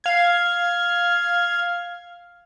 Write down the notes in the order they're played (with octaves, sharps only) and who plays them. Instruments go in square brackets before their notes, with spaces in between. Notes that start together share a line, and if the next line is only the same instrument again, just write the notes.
[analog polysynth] F5 G#6